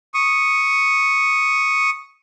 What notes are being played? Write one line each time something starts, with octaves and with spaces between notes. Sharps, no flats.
C#6 D#6